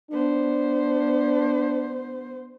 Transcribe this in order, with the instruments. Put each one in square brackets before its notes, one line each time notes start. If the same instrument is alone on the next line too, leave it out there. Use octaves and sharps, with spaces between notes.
[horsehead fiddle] B3 C5 [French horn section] D4